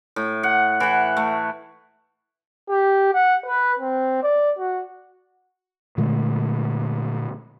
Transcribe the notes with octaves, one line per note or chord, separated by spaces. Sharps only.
A2
F#5
E3 F#5
A3
G4
F#5
B4
C4
D5
F#4
A#2 D3 G#3 A3